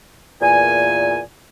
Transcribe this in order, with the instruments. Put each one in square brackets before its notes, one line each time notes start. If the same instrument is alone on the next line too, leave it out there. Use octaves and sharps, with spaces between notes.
[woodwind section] E2 A#2 G#5